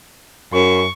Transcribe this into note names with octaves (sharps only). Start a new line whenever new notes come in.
F#2 C#6